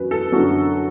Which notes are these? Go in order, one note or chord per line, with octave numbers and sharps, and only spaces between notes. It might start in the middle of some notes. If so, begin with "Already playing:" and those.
Already playing: F#2 F#3 B4
A4
F#2 D3 F#3 F#4